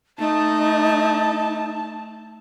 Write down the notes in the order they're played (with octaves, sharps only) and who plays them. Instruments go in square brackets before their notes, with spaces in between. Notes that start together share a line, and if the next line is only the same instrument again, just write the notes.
[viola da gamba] A3 [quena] D#4 [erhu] A5